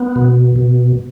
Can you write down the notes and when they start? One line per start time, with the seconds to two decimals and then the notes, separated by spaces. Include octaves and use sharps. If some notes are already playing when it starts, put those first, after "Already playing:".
Already playing: B3
0.16 B2
0.56 B2